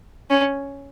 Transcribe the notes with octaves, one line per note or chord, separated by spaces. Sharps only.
C#4